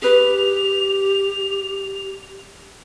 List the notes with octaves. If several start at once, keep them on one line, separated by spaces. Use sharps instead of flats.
G4 G#4 B4 F7